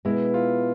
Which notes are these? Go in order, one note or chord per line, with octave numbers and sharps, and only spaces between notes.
B2 G#3 B3 E4
F4